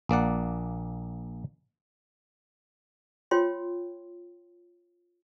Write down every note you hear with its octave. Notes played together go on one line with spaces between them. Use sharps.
A#1 A#3 D5 F#5
F4 C#5 G5 C6